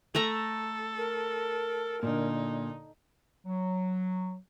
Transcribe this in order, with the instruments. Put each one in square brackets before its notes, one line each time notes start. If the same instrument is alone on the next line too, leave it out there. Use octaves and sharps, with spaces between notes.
[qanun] A3 E5 A#5 [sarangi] A4
[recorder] A#4
[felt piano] A#2 D3 [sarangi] D#4
[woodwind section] F#3